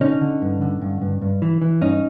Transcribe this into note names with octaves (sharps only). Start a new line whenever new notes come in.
D3 C#4 D#4
D3
G2
D3
G2
G2
G2
E3
E3
G2 C#4 D#4